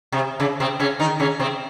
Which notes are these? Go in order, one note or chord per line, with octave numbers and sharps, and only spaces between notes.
C3
C#3
C3 C4
C#3 C#4
D#3 D#4
C#3 C#4
C3 C4